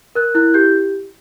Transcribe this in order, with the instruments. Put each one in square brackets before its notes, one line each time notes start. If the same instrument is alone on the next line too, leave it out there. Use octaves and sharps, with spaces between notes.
[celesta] A#4 F#6
E4 F#6
G4 G6